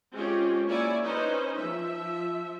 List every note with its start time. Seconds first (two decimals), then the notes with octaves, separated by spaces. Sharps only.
0.14 G#3 C4 C#4 F4 G4
0.69 A#3 E4 C#5 D5 G#5
1.04 C#4 D#4 B4 C5
1.57 F3 E5